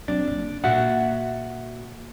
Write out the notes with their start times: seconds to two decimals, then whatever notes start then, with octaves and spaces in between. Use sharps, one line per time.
0.08 F#3 C4 D4
0.28 F#1
0.64 A#2 A#3 F#4 E5 F#5